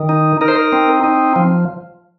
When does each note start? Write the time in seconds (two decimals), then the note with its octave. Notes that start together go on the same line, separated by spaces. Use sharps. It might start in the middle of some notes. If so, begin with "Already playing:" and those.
Already playing: D#3
0.09 D#4
0.41 D#4 A#4
0.48 C5
0.55 A#4
0.72 C4
1.04 D#4
1.36 F3